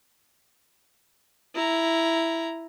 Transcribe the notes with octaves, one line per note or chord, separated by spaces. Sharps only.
E4 A#5